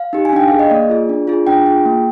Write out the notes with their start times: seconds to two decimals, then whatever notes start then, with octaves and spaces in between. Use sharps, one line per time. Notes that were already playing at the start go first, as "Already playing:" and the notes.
Already playing: F5
0.13 D#4 G4
0.25 G#5
0.33 D4 G5
0.48 G#4 F5
0.59 D#5
0.70 A#3 D5
0.90 F4 G#4
1.09 D4
1.27 F4 G#4
1.47 D4 G5
1.66 F4 G#4
1.86 A#3